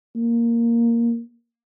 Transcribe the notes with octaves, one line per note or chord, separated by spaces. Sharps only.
A#3